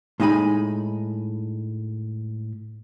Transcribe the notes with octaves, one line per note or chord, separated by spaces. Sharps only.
A2 G#3 D#4 D#5 G#5 B5